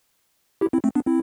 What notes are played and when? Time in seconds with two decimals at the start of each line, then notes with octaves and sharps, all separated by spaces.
0.61 E4 G4
0.73 C4 E4
0.84 A3 C4
0.95 B3 D4
1.06 C4 E4